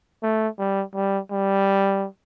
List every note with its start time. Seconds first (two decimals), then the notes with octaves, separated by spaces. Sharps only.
0.23 A3
0.58 G3
0.94 G3
1.31 G3